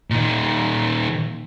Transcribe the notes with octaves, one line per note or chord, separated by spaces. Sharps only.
A#2 D#3